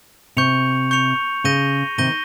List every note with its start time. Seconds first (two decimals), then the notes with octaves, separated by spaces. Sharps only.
0.36 C3 C#6 G6 C#7 F7
0.91 C#6 G6 C#7 F7
1.44 C#3 G6 A#6 D#7 G7
1.98 C3 D#3 G6 A#6 D#7 G7